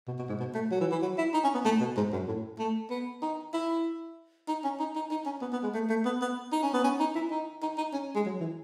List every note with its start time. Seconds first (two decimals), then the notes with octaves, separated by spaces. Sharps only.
0.08 B2
0.19 B2
0.29 G#2
0.40 B2
0.54 A3
0.71 F#3
0.81 E3
0.91 E3
1.02 F#3
1.18 E4
1.34 D#4
1.44 C#4
1.54 B3
1.65 A3
1.81 B2
1.97 G#2
2.12 F#2
2.28 A2
2.59 A3
2.90 B3
3.22 D#4
3.54 E4
4.48 D#4
4.64 C#4
4.79 D#4
4.96 D#4
5.11 D#4
5.26 C#4
5.42 B3
5.52 B3
5.63 G#3
5.74 A3
5.89 A3
6.05 B3
6.21 B3
6.52 D#4
6.63 C#4
6.74 B3
6.84 C#4
7.00 D#4
7.15 E4
7.31 D#4
7.62 D#4
7.78 D#4
7.93 C#4
8.15 G#3
8.26 F#3
8.40 E3